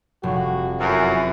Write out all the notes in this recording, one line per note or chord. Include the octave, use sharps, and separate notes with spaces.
F1 F#4
F#2 E3